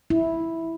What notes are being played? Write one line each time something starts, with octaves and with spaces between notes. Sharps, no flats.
E4